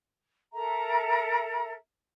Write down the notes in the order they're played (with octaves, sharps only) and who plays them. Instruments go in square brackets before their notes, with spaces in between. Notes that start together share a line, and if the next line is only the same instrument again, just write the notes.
[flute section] A4 A#4 E5 A#5